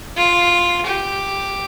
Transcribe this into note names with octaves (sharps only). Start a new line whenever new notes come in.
F4
G4